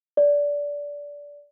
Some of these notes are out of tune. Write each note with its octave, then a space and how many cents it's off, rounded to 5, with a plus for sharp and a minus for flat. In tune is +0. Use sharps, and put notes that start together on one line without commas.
D5 -20